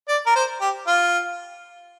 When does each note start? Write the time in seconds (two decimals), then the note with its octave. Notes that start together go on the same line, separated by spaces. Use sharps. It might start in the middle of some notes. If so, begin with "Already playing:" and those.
0.08 D5
0.26 A#4
0.35 C5
0.61 G4
0.87 F4